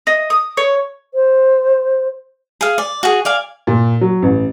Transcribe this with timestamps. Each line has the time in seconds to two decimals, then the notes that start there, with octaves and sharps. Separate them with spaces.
0.07 D#5
0.30 D#6
0.57 C#5
1.14 C5
2.61 G#4 F5
2.78 D5
3.03 F#4 G#4
3.25 D5 F5 G#5
3.67 A#2
4.01 F#3
4.22 A1